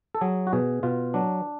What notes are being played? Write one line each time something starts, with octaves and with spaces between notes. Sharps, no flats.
A4
F#3 G#4
F#4
B2 G#4
B2 F4
F#3 D4